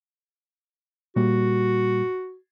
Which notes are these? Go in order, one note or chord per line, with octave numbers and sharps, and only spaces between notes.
A#2 G3 A#3 F#4